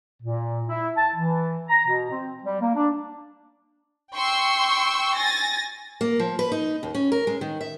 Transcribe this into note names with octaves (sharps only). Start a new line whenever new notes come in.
A#2
E4
A5
E3
A#5
B2
C4
G3
A#3
D4
G5 C6 C#6 E6
G#5 A6 A#6
A#3
F3
B4
D#4
D#2
C#4
A#4
G#3
D#3
E5